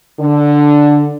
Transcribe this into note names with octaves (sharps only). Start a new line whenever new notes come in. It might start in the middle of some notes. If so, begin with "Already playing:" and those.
D3